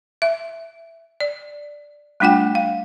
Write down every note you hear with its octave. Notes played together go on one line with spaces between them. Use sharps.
E5
D5
G3 A3 D4 F4 F#5 G5
F5